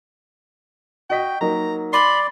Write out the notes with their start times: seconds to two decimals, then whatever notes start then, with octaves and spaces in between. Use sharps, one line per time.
1.10 F#4 D#5 G5 B6
1.41 F#3 A#3 D#4 A#5
1.93 D5 B5 C6